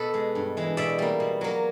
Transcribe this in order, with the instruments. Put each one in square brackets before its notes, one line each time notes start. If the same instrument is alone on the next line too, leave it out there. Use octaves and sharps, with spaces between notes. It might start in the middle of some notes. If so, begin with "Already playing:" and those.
Already playing: [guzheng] B2 A4 B4
G#3
G2
E3 G#3
B2 D5 E5
G3 A#3
B2
F#3 A#3